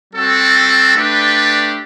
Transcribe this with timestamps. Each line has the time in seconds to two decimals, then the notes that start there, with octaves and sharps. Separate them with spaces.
0.13 G3 C4 F#4 A4
0.95 A3 D4 G4 B4 D5